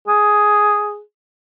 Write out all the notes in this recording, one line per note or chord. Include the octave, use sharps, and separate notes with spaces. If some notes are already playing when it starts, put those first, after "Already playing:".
G#4